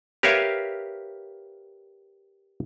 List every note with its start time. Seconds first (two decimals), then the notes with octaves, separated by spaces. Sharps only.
0.23 G4 A#4 B4 C#5 E5 F5